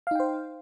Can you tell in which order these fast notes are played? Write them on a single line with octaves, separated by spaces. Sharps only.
F5 D#4 G5 C5